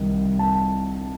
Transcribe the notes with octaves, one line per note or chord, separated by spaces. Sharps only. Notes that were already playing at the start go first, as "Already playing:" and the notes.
Already playing: C2 C3 D#3
A5